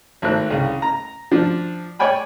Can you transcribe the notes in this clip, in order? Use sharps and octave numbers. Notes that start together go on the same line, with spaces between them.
G#1 A3 C5 F#6
C2 C#3
A#5
F3 D4
C#5 D5 G5 G#5 B5